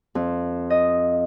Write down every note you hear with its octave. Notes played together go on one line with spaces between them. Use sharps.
F2
D#5